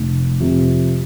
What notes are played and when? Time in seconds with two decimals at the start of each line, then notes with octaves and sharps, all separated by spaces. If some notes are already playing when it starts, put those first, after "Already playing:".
Already playing: F1
0.40 F2 C3